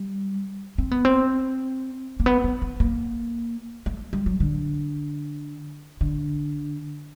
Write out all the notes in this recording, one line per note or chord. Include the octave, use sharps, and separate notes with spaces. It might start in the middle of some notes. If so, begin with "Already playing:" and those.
Already playing: G3
C4
B3
C4
A#3
B3
B3
B3
A#3
A3
G3
F#3
D3
D3